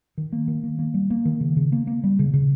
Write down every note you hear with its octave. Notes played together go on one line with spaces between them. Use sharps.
D#3
A#3
D#3
A#3
A#3
G3
A#3
D#3
C#3
C#3
A#3
A#3
G3
C#3
C#3